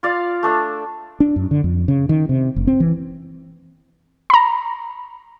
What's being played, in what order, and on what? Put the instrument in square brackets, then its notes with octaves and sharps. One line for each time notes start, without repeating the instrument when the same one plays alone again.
[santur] F4 D5 F5
A3 D4 E6
[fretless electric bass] D4
F#2
D3
F2
C#3
D#3
C3
F#1
C4
E3
[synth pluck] A#5 B5